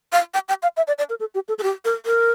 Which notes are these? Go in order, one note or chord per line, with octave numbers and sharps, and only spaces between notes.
F5
G5
G5
F5
E5
D5
D5
A#4
A4
G4
A4
A4
G4
A#4
A#4